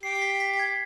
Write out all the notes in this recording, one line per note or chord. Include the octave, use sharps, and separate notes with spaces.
G4 C7
C7
B6
B6
B6
G#6